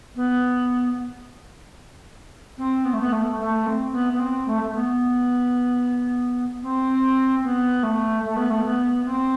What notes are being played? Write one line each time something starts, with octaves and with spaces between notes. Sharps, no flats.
B3
C4
B3
A3
B3
A3
A3
C4
B3
B3
C4
A3
A3
B3
C4
B3
A3
A3
B3
A3
B3
C4